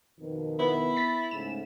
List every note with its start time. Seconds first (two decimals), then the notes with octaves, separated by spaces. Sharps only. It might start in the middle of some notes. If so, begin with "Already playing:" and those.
0.20 F2 B2 D#3
0.59 B3 E4
0.97 A6 B6
1.31 G#2 C#3 A3 E7